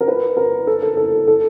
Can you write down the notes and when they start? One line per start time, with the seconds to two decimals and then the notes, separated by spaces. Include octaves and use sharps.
0.01 A#4
0.08 B4
0.37 A#4
0.67 A4
0.82 A4
0.97 A4
1.27 A4